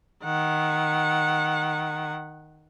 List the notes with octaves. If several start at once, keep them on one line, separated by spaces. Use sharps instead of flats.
D#3 F#5